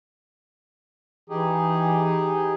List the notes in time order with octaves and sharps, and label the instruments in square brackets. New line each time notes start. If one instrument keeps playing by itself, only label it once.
[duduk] E3 [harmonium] D#4 G4 G#4